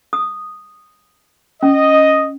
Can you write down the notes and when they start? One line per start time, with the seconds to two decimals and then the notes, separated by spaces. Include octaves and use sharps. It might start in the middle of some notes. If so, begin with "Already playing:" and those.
0.13 D#6
1.63 C#4 D#5